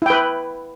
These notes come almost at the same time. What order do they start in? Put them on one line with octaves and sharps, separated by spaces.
E4 G5 B4